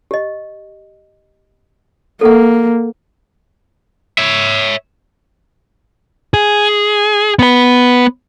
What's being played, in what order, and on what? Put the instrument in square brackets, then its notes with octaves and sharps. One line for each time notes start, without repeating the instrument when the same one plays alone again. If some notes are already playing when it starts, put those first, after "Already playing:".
[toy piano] G4 D#5
[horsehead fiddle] A#3 [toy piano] A4 F#5
[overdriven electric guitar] C#5 E5
[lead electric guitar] G#4
B3 B4